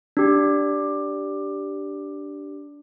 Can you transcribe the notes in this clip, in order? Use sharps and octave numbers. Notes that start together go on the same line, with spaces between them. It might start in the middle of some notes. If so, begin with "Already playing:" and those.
D4 G4